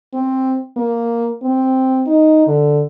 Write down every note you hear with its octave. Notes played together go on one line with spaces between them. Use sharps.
C4
A#3
C4
D#4
D3